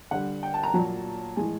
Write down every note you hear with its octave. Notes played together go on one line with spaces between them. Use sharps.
D3 G3 F#5
G5
A5
A#5
A#2 F#3 A5
A2 E3 G#3 G#5